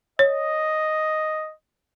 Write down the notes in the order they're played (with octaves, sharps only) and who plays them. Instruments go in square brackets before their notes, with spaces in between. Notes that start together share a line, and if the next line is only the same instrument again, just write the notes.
[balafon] C#5 [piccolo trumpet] D#5